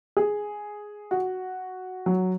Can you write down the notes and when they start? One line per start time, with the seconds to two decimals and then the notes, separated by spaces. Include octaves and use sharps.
0.17 G#4
1.11 F#4
2.06 F#3